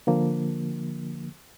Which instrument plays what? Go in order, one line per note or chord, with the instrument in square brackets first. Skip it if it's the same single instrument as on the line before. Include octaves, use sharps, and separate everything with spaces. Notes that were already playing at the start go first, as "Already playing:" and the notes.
[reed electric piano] D3 F3 A#3